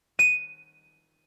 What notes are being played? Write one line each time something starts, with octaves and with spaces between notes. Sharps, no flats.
D#7